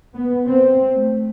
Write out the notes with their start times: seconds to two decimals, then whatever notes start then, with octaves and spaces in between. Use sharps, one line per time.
0.13 B3
0.47 C4
0.94 A3